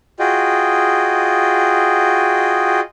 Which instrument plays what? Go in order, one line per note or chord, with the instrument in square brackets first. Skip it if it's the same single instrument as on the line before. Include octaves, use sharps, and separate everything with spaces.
[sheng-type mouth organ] F4 F#4 G#4 D#5 G5